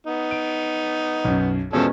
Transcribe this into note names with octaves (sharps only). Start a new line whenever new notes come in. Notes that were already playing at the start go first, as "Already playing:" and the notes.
B3 D#4
D7
B1 F#2
E2 B2 F3 G#3 C#4 A4